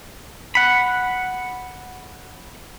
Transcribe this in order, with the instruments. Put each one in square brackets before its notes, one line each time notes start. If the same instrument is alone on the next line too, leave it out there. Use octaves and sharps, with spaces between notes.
[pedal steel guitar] F#5 B5